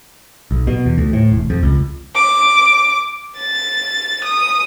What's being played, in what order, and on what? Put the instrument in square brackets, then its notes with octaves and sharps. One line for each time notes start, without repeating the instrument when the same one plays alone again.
[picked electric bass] B1
B2
E2
D2
A2
E1
F2
C#2
[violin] D6
A6
D#6